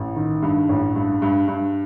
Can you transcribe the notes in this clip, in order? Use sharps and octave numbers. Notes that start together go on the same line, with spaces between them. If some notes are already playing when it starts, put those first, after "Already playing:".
Already playing: A1
D#3
G2
A1
G2
G2
G2